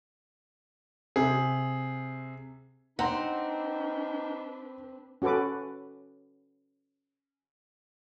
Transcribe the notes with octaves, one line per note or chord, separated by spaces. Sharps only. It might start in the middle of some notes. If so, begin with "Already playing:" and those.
C3 G#4
C4 D4 D#4 B4 F#5 A#5 C6
C#4 F#4 A4 B4 D6